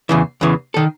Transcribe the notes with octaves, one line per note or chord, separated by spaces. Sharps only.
E2 C#3 E3
E2 C#3 E3
D#3 A4